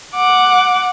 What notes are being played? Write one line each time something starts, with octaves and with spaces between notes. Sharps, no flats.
F#5 D6